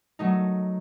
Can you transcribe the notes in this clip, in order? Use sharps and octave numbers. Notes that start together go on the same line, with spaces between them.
F#3 A3 D#4